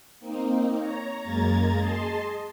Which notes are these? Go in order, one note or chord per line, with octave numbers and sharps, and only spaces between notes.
A#3 C4 D#4
C#5 A#5
F#2 G#3 A#3 A#5 G#6 A6
G#4 D#5 A5 C6